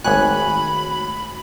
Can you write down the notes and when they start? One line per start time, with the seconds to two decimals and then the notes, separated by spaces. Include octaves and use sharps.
0.04 G#1 A3 F#4 C#5 G#5 B5 F#6